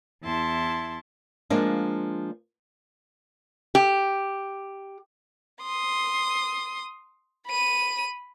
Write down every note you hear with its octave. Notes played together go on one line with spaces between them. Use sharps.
E2 E4 A5 C6
F3 G#3 A#3 D4
G4
C6 D#6
B5 D#7